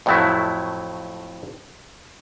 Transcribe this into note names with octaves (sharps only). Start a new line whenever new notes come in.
F2 A2 F3 F#3 A3 E4